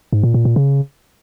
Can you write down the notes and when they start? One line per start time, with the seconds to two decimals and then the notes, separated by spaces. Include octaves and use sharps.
0.13 G#2
0.23 A#2
0.34 A#2
0.45 A#2
0.56 C#3